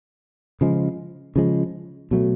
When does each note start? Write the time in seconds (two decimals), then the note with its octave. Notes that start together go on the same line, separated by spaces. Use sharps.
0.61 C#3 F3 G#3
1.36 C#3 F3 G#3
2.11 B2 F#3 A3